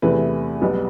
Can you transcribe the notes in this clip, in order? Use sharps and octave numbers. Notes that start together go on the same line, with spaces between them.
E2 C3 E3 A3 E4 B4
B1 B2 G3 B3